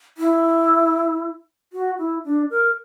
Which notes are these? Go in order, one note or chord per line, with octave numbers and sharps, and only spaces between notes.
E4
F#4
E4
D4
A#4